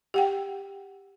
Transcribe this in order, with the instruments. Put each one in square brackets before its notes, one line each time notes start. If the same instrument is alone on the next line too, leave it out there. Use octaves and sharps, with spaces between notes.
[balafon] G4 F#5 G5